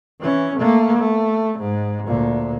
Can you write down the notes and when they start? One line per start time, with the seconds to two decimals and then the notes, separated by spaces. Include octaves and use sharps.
0.20 E3 C#4
0.58 A3 A#3
0.98 A3
1.59 G#2
2.06 D2 A#2